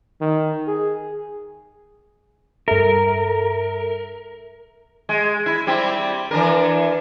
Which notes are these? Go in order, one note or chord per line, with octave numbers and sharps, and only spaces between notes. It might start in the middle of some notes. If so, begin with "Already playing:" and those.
D#3
G#4
G2 A4 A#4 E5
G#3
E4
G3 C4 E4
E3 D4 A#4